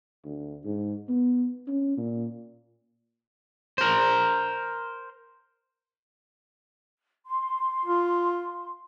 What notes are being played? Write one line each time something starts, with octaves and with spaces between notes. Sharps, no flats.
D2
G#2
B3
C#4
A#2
A#4 C5
C6
F4